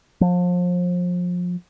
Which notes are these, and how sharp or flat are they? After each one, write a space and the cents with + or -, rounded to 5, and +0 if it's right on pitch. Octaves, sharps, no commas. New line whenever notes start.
F3 +30